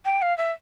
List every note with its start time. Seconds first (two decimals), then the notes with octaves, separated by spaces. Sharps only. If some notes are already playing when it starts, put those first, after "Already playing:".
0.05 G5
0.22 F5
0.38 E5